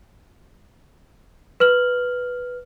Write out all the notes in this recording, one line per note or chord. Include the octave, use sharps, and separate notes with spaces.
B4 F6 F#7